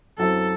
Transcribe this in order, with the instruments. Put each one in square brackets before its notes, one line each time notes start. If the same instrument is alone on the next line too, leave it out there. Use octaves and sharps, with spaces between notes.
[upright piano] F#2 F#3 C4 E4 [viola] A4